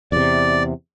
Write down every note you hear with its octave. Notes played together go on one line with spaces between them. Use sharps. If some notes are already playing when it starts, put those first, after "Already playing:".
E2 C3 D5